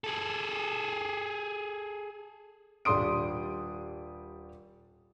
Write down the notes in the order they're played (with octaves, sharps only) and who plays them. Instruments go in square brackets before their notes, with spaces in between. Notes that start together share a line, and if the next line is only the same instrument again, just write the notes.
[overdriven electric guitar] G#4 A4
[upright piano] D#1 G3 D4 C6 D#6 D7